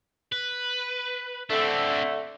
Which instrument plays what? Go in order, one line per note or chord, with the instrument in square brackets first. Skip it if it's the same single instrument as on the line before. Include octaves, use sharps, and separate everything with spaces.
[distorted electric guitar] B4
[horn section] D3 A3 [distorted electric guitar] C4 D4